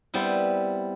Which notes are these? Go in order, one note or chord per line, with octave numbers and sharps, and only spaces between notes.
G3 B3 C4 E4